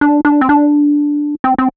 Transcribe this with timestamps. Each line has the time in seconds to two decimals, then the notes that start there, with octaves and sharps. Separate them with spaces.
0.01 D4
0.25 D4
0.41 C4
0.49 D4
1.44 C4
1.58 C4